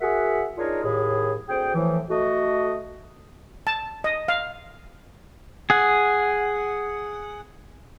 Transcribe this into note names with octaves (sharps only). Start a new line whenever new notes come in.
F#4 G#4 A#4 E5 F#5
D4 D#4 F4 G#4 A#4 C#5
D#2 A2 G#4
D2 C4 G#4 G5
A2 E3 F3
A3 F#4 D#5
A5
D#5
F5
G#4 F#5